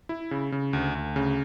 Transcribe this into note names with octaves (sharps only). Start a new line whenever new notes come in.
E4
C#3
C#3
D2
D2
C#3